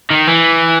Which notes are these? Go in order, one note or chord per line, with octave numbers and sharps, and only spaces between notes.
D#3
E3